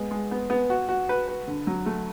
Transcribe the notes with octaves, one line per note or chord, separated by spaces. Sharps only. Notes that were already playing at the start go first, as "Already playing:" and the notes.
Already playing: G#3 B3
G#3
B3
B3
F#4
F#4
B4
B4
D3
F#3
A3